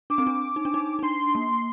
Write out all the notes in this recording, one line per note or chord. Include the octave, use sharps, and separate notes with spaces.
D4 D6
C4
D4
D#4
D4
D#4
D#4
D4 C6
A#3